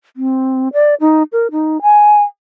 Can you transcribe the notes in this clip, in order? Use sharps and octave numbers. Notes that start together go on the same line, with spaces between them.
C4
D5
D#4
A#4
D#4
G#5